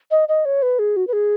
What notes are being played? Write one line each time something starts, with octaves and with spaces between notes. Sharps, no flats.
D#5
D#5
C#5
B4
G#4
F#4
B4
G#4